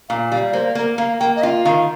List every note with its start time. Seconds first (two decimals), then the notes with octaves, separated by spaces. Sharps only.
0.09 A#2 F5
0.32 G3 F5
0.53 A#3 C5
0.75 A#3 A#4
0.98 A#3 F5
1.20 A#3 G5
1.36 D#5
1.42 F4 F5
1.65 D#3 F5